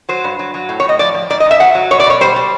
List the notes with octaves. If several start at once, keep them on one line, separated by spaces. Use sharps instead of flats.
F#3 C5
G2
F#3
F#3
A2
C#5
A2 D#5
F3 D5
F3
G#2 D5
D#5
G#2
E5
F#3 F#5
F#3
B2 C#5
D5
B2 C#5
G3 C5
G3